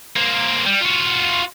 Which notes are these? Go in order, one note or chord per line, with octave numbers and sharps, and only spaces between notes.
A#3 C4
G3
F4 F#4